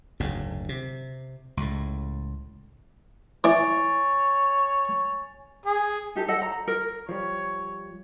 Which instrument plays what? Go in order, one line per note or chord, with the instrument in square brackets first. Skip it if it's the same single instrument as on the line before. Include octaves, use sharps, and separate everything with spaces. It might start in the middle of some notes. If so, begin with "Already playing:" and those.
[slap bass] F#1 D2 G#2
C3
C#2 A2
[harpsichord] E3 D5 [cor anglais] C#5 [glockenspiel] G#5 A6
[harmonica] G#4
[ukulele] D#4 G4 A4
A4 D#5 F#5
A#5
A#4
[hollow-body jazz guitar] F3 G3 [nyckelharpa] C#5